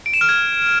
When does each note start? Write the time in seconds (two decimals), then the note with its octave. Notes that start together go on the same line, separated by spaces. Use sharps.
0.06 D7
0.14 E7
0.21 F6
0.29 G#6